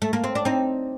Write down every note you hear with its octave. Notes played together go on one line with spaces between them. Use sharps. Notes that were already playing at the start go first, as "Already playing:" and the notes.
A3
A#3
C4
D4
C4 D#4